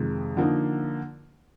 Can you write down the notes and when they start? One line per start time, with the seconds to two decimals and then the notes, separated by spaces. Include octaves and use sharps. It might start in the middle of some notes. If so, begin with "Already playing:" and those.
Already playing: F2 C3 D#3 G#3
0.37 D3 F3 A#3 D#4